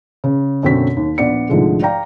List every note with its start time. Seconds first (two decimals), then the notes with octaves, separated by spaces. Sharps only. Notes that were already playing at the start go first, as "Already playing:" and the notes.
0.24 C#3
0.63 F#2 B2 D3 C4 C#5 B6
0.97 D#2
1.18 A#1 B3 D5 C#7
1.49 C2 G#2 D3 F3 G#3 A3
1.82 D5 F5 G5 A#5